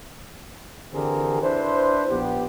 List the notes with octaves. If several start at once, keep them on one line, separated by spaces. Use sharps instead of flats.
D3 E3 C4 G4 G#4 A#4
D4 E4 B4 C5
A#1 B3 G4